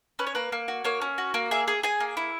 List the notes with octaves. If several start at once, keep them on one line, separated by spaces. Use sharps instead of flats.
C#4 B4
C#5
A#3 B4
A#3
F#4
A#3 C#5
C#4
F#4
A#3
G#4 E5
G#4
G#4 G#5
A#3
E4